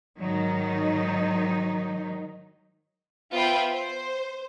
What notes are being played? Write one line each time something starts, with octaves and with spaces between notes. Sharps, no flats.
G#2 D#3 F#3 D#4
B3 F4 C5 E5 G5 B5
C5